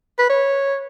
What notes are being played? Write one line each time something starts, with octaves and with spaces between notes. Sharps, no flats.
B4
C#5